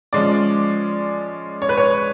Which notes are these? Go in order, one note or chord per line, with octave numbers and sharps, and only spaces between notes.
F3 G#3 C#4 D5
C#5
B4
C#5